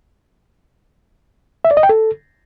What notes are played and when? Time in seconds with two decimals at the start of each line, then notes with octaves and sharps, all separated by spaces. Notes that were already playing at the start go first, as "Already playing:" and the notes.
1.65 E5
1.71 D5
1.77 D#5
1.83 G5
1.89 A4